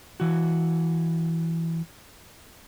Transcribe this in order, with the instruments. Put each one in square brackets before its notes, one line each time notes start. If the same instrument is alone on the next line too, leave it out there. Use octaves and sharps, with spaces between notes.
[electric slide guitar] E3 F#4